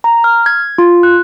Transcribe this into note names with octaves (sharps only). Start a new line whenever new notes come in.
A#5
F6
G#6
F4
F#6